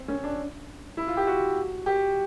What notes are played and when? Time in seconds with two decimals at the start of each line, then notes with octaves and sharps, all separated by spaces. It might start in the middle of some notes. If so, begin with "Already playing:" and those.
Already playing: C4
0.08 C#4
0.24 D4
0.97 E4
1.07 F4
1.17 G4
1.27 F#4
1.86 G4